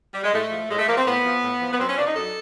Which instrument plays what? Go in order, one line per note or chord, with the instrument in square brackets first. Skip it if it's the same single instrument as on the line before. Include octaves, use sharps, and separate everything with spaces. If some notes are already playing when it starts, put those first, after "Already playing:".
[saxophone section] G3
G#3
A2 A3
F3
A2 G#3
A3
F3 A#3
C4
A2 B3
F3
A2
F3
B3
F#2 C4
C#4
C#3 F3 D4
D#4
F#2 A4